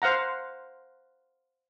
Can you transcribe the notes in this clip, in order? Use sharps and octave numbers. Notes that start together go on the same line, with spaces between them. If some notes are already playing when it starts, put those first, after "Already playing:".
C5 F5 F#5 A#5